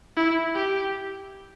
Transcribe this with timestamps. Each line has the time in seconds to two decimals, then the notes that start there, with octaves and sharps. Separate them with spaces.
0.16 E4
0.55 G4